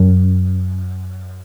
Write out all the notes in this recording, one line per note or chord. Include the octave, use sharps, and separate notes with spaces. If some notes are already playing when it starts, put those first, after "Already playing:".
Already playing: F#2